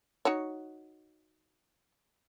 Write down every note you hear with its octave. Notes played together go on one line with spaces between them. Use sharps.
D#4 F#4 C#5